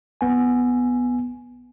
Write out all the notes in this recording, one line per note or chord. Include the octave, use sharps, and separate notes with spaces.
A#1 B3 G#5